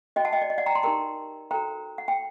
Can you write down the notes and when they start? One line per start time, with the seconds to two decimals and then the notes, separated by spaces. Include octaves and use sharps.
0.16 F#4 C5 D#5 G5
0.25 F#5 A5
0.33 D#5 G5
0.42 D5
0.50 D#5
0.58 D5 F#5
0.66 G5 A#5
0.75 A5 C6
0.83 D#4 G4 A#4 G5 A#5
1.51 F#4 A4 C5 G5 A#5
1.98 F#5
2.08 G5